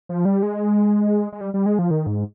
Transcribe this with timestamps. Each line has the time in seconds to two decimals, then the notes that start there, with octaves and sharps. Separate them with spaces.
0.09 F3
0.25 G3
0.43 G#3
1.32 G#3
1.41 G3
1.54 G3
1.66 G#3
1.79 F3
1.91 D#3
2.07 G#2